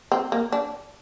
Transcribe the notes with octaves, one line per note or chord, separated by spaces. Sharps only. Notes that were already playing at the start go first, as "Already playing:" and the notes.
C4
A#3
D4